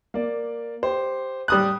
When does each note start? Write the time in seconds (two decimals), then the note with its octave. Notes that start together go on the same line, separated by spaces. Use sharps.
0.14 A#3 D5
0.83 G4 C5
1.48 G3 D#6 F#6